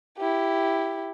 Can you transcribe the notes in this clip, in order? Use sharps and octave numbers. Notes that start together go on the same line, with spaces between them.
E4 G4